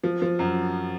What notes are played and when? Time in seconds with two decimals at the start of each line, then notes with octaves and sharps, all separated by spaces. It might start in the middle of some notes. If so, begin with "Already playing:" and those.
0.04 F3
0.22 F3
0.39 F#2